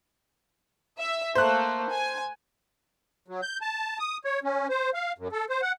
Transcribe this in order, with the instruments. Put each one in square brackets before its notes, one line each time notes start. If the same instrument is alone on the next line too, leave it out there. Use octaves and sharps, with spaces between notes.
[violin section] E5
[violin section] A3 A#3 [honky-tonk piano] C5 F#6
[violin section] G#5
[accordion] F#3
G6
A5
D#6
C#5
C#4
C5
F5
F#2
A4
C5
F#5